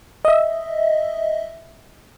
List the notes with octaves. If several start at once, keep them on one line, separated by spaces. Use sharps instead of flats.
D#5 E5